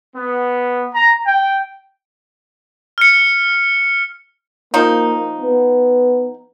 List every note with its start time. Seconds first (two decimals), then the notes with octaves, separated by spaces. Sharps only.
0.16 B3
0.94 A#5
1.26 G5
2.98 F6 C#7
4.74 F3 A#3 D#4
5.41 B3